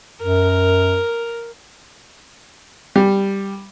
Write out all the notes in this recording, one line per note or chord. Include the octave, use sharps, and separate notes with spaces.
F#2 A#4
G3